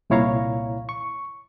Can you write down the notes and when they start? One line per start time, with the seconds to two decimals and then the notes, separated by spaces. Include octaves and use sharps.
0.10 C2 A#2 E4 C#5 F5 A#5
0.89 C#6